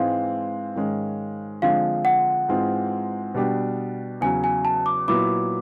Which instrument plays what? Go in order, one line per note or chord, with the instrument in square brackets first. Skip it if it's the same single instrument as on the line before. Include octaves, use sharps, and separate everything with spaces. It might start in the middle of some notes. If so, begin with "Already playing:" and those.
Already playing: [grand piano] G#2 E3 G#3 C4 [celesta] F5
[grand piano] G#2 D#3 G#3 C#4
[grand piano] D3 F3 G#3 C4 [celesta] F5
[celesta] F#5
[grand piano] G#2 E3 G#3 C4 F4
B2 G3 B3 D4 G4
[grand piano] E2 C#3 F#3 [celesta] G#5
[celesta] G#5
A5
D6
[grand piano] A#2 F#3 B3 E4 [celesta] D6